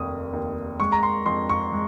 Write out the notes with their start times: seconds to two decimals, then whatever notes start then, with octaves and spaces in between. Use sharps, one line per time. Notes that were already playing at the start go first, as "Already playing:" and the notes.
Already playing: F1 D#2 D#6
0.33 D#2
0.80 G#3 C#6
0.92 A#5
1.03 C6
1.26 F2 C6
1.49 C#6
1.73 G#3